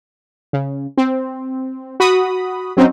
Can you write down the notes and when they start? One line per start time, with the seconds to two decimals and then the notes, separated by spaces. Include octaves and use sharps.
0.53 C#3
0.97 C4
2.00 F#4 B5 D#6
2.77 F#3 C4 C#4 D#4